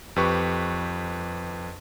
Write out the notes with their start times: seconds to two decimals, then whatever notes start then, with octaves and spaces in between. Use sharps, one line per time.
0.16 F2 G4 B4 C#6